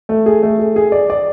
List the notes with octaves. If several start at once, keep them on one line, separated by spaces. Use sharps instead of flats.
A3
G#4
A3
G#4
G#4
D5
D5